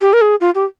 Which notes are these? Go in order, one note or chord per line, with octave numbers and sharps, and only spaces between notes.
G4
A#4
G#4
F4
G4